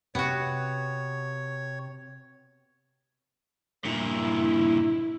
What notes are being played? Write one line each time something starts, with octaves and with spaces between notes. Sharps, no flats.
C3 B3 F#4 C#5
G2 A#2 E4